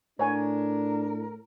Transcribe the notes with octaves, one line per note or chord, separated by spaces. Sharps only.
A2 D4 A#4 C#5 G#5